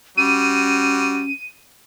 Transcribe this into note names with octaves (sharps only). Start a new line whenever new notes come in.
G3 C#4 F#4 D#7